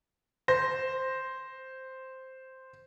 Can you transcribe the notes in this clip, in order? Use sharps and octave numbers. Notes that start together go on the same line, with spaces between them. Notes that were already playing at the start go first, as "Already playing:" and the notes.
C5 A#6